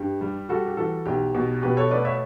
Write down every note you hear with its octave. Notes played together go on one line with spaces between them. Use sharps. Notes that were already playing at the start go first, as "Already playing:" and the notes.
Already playing: G2 G4
G3
G3 F#4 A4
G4
E3 F#4 A4
B1 G4
B2
B2 G4 B4
A4 C#5
A3 B4 D5
C#5 E5